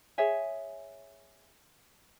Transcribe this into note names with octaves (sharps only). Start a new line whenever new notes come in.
G#4 C#5 E5 G#5